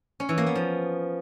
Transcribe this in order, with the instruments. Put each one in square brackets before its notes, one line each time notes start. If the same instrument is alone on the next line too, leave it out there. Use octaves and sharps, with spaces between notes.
[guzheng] C#4
E3
A#3
B3
F3